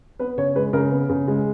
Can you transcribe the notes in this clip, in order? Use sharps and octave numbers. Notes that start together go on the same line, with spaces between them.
B3 B4
C#3 C#5
G#3 B4
C#3 A#4
B3
C#3
G#3